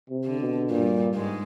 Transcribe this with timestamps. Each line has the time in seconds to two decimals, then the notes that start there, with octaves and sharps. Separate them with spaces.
0.10 C3
0.25 D3
0.40 B2
0.69 G2 A#2 G3
1.15 G#2 G#3